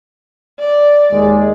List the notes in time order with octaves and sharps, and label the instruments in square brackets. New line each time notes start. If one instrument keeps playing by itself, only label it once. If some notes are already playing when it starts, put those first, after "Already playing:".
[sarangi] D5
[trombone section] D#2 G#3